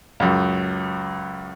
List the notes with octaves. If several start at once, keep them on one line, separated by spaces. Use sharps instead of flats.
C#2 F#2